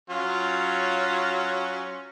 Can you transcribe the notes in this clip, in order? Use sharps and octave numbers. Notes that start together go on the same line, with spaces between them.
F#3 C#4 F4